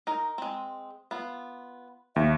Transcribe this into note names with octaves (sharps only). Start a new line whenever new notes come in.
D#4 A#4
G#3 C4
B3 F4
D#2 E5